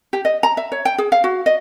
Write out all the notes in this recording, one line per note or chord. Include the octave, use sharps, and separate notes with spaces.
G4
D#5
A#5
E5
C#5
G5
G#4
F5
F#4
D#5